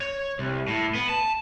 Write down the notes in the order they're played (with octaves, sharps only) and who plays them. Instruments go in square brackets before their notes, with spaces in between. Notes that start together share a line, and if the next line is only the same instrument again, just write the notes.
[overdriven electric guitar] C#5
C2
A2
B3
A5